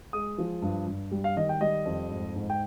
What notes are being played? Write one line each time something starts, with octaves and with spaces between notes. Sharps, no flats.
G#3 D#6
F3
G2
G2
G3
F5
D#3 D#5
G5
G3 D#5
F2
G#2
G#2
G5